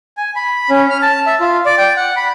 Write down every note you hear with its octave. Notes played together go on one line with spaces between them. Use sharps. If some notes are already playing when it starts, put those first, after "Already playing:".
G#5
B5
C#4
F6
A5
E5
F4
D5
G5
F#5
B5